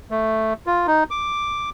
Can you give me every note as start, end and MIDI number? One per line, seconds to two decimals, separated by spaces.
0.11 0.53 57
0.67 0.87 65
0.87 1.04 63
1.10 1.70 86